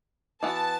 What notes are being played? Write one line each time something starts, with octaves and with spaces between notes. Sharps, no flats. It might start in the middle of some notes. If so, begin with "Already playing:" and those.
E3 B3 F#4 A5